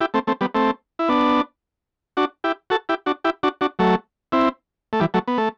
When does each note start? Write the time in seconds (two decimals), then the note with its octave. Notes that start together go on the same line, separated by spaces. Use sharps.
0.01 E4 G4
0.14 A3 C4
0.27 A3 C4
0.41 G3 B3
0.55 A3 C4
0.99 E4
1.08 B3 D4
2.17 D4 F#4
2.44 E4 G4
2.70 F#4 A4
2.89 E4 G4
3.06 D4 F#4
3.24 E4 G4
3.43 D4 F#4
3.61 D4 F#4
3.79 F#3 A3
4.32 C4 E4
4.93 A3
5.00 E3 G3
5.14 F#3 A3
5.28 B3
5.38 A3